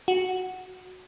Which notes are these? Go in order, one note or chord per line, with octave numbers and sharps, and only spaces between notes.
F#4